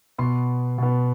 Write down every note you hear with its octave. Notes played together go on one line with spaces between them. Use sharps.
B2 B3 C6
B2 B3